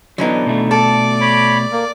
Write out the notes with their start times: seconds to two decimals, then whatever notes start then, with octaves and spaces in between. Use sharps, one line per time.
0.18 D3 E3 F#3 B3 D#4
0.46 B2 A3
0.71 A4 D5 D6
1.21 C#5 B5
1.72 A#3